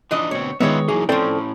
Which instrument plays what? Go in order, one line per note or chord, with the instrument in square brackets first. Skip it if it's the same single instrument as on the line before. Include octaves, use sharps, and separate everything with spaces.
[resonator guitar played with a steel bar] E3 D#5 [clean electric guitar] F3 D4 D#4
[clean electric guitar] D2 B2 C4 [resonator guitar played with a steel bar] C#5
[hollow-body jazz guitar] D#3 G#3 B3 [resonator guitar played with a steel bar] D#4 C#5 [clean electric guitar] F4 B4 E5
[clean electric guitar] E3 F#3 A#3 [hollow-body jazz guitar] G#4
[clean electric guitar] A2 C#4 [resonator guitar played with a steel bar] F3 C4 [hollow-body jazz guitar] A4 D5 G5